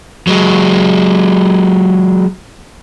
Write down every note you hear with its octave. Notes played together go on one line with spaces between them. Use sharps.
F#3 G#3